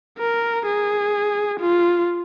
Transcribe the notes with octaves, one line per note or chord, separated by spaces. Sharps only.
A#4
G#4
F4